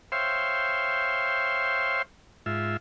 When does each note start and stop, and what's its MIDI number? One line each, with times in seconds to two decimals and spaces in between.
0.12 2.02 72
0.12 2.02 73
0.12 2.02 76
0.12 2.02 77
0.12 2.02 79
0.12 2.02 84
2.46 2.77 44
2.46 2.77 65
2.46 2.77 76